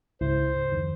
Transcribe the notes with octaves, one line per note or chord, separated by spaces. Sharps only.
C#2 G#2 E4 C5
C#2
F2 D#3